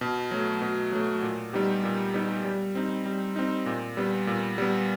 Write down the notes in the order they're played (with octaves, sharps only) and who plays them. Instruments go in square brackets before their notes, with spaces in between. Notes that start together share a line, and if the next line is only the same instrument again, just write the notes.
[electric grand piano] B2
F#3 A3
B2
F#3 A3
A#2
G3 B3 D#4 G4
A#2
G3 B3 D#4 G4
G3
C4 D#4
G3
C4 D#4
A#2
G3 B3
A#2
G3 B3